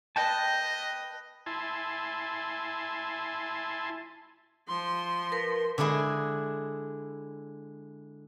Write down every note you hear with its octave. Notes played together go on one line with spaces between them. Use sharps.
B4 D#5 G5 A5
E4 G#5 A5 C6
F3 C6
A#4 B4
D3 G#3 D4 E4 G#4